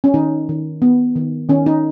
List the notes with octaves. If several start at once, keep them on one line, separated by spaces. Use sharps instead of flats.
C#4
D#3 D#4
D#3
B3
D#3
D#3 C#4
D#4